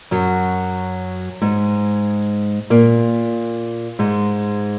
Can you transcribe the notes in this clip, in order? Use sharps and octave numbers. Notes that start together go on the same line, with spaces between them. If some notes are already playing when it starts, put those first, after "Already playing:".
F#2 F#3
G#2 G#3
A#2 A#3
G#2 G#3